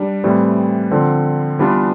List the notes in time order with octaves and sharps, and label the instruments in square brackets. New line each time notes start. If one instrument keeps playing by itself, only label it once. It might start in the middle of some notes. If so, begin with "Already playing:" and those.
Already playing: [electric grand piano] G3 D4
A2 E3 G3 C4
D3 F3 C4
E3 G3 B3 D4 F4